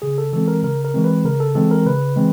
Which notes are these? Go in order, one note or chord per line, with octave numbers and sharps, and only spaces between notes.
C#3 G#4
A4
E3 G#3 C4 A4
A#4
C#3 A#4
A#4
E3 G#3 C4
B4
C#3 A#4
A4
E3 G#3 C4 A4
A#4
C#3 B4
E3 G#3 C4